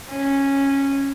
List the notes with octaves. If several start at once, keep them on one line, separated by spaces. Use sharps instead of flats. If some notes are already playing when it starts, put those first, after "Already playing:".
C#4